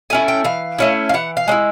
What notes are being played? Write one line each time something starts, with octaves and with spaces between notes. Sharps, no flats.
A3 C#4 E4 G#5
G5
E3 F5
A3 C#4 E4
F5
E3 F#5
F5
G#3 C#4 E4